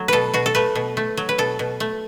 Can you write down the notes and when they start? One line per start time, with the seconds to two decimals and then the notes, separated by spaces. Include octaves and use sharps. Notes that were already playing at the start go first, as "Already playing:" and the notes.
Already playing: F#3 A3
0.08 B2 A4 B4
0.33 B2 F#4
0.46 A4
0.55 A3 B4
0.75 B2
0.97 A3
1.17 F#3
1.29 B4
1.38 B2 A4
1.59 B2
1.80 A3